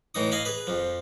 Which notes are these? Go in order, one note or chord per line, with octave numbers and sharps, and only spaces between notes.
A2 E3 D#4 D#6
D#5 F5 G#5 B5
G#4 B4
F2 F3